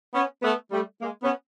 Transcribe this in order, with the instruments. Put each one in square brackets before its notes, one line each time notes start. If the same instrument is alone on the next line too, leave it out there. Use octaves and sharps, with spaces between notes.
[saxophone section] B3 C#4
A3 B3
G3 A3
G#3 A#3
B3 C#4